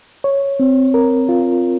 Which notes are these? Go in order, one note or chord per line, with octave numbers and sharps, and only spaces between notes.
C#5
C4
A#4
F4